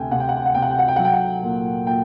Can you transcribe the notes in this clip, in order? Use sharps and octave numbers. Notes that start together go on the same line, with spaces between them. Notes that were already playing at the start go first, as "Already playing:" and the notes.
Already playing: D2 C3 G5 G#5
C3 F#5
G5
F#5
G5
F#5
C3 G5
F#5
G5
F#5
G5
F#3 F#5
G5
F#5
A#2
A#2 G5